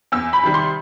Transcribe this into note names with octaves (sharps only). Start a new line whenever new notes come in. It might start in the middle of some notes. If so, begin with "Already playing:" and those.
E2 E6
B5
C3 D#3 G3
C6